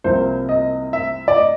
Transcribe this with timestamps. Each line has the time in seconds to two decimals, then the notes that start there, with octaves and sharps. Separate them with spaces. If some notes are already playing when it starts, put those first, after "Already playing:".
0.04 C2 C3 F3 A#3 C5
0.49 D#5
0.93 E5
1.28 D5
1.37 D#5